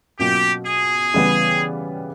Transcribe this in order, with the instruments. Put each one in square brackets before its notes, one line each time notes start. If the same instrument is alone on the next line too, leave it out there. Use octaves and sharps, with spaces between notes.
[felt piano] B2 F#3 A#3 C#4 F4 [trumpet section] G4
[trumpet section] G#4
[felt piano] C#3 E3 G3 B3